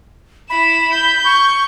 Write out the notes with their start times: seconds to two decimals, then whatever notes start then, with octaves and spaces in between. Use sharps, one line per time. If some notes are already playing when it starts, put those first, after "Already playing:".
0.50 E4 B5 E7
0.92 G6
1.25 C#6